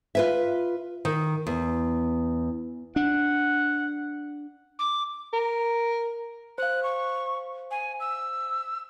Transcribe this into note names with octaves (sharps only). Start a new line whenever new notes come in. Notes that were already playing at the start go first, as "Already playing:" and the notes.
F4 B4 E5
D#3
E2
D4 F#5
D6
A#4
C5 F5 F#6
C#6
G#5
E6